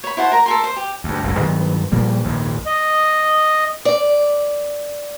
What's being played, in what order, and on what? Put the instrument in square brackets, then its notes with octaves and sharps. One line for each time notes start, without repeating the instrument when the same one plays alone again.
[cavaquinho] C#5 B5
E4 C5 F#5 A5
A#4 A#5
A4 A#4 C6
C5
G4
[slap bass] D2 G2
F#1 C#2 F#2 A2
G2 D#3 F#3 B3
A#2 F3 G3 A#3
A#1 D#2 G#2
[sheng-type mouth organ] D#5
[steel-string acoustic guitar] D5